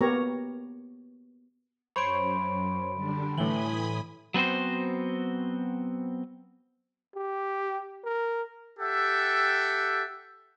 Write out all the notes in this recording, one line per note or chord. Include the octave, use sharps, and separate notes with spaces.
A#3 B3 G4 A#4 C#5 A#5
F#2 C5 C#5 B5 C6 D7
D3 G3 D4
A2 E3 G#5 B5 D#6 F#7 G7
F#3 B3 C4 F#4 C5
G4
A#4
G4 A4 E5 F#5 G5